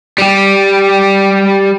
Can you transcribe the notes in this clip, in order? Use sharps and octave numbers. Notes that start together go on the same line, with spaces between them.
G3 G4